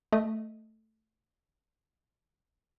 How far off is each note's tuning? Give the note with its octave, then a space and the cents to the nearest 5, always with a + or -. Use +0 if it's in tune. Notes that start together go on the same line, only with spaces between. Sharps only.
A3 +0 D#5 +0